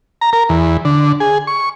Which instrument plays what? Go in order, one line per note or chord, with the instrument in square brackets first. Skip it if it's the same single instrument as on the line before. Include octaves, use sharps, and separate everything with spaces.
[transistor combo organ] A#5
A#4
E2
D3
G#4
C#6